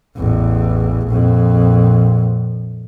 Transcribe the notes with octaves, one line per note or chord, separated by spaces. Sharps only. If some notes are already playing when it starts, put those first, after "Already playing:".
A1 E2
A#1 F2